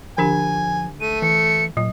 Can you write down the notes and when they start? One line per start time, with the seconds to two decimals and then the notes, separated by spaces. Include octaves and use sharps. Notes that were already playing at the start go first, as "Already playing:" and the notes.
0.18 D3 F3 D4 G4 G#5
1.01 A3 D#7
1.22 E3 C#7
1.77 A#2 F#3